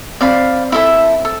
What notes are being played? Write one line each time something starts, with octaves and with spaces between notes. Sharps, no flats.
C4 D5 F5 B5
E4 A4 E5
A4